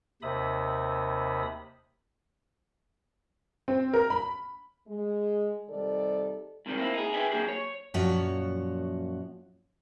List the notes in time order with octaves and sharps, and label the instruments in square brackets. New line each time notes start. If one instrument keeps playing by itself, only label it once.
[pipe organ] D#2 C3 E5 B5 D#6
[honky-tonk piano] C4
A#4
B5
[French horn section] G#3
C3 D#3 G3 A4 D5
[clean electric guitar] G#2 C3 D#3 G3
A#3 C4 E4
D#4 G#4
G4 G#4 B4 E5 G5 G#5
F#3 G#3 A#3 D4 G4 G#4
C#5
[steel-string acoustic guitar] F#2 A#2 F3 F#4 C#5